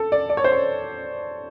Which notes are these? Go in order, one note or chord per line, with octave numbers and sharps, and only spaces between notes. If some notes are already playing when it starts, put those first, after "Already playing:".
Already playing: A4
D5
D5
C#5
C5
C#5